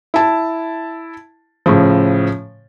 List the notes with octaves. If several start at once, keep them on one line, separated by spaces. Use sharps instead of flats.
E4 A5
A2 C#3 F3